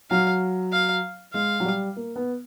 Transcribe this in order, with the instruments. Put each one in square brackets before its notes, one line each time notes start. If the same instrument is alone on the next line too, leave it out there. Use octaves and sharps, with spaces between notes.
[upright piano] F#3 [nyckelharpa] F5
[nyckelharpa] F5
[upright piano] G#3 [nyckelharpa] F5
[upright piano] F#3
G3
A#3
B3